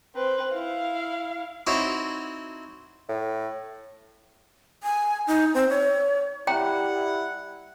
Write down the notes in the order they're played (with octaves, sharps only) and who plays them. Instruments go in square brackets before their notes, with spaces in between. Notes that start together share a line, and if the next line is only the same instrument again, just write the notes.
[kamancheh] C4 B4
E4 F5
[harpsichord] C4 D#4 E4 F#4 C5 C#5
[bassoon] A2
[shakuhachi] G#5
D#4
C4
C#5
[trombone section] G3 E4 [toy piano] C#5 G5 A#5 [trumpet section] F#5